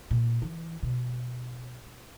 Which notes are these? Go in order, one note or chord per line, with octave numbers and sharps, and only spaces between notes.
A#2
E3
B2